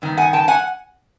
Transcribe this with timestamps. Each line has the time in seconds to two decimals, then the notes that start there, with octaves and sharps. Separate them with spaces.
0.02 G2 D#3 B3
0.17 F#5 G#5
0.33 G5 A5
0.48 F#5 G#5